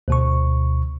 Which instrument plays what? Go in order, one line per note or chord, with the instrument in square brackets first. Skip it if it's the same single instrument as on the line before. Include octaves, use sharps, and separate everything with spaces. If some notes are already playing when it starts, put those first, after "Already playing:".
[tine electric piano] D2 B2 C#6